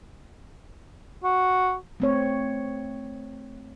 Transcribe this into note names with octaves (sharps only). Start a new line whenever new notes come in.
F#4
A3 C4 C#5